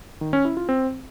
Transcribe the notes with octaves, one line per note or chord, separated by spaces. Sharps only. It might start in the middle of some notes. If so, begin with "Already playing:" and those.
D#3
C#4
E4
F4
C4